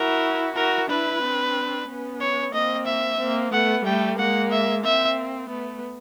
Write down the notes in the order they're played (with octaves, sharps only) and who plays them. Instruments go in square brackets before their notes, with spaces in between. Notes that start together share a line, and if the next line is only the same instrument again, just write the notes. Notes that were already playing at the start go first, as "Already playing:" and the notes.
Already playing: [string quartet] E4 F#4 [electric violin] A#4
[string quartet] E4 F#4 [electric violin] A#4
[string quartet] D4 E4 [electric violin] B4
[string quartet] C4 D4
B3 C#4
[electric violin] C#5
[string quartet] A#3 C4 [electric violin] D#5
[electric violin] E5
[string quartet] A#3 C4
[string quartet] A3 B3 [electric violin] F#5
[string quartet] G3 A3 [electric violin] G5
[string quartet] G#3 A#3 [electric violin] F#5
[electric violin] E5
[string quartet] A#3 C4 [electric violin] E5
[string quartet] A3 B3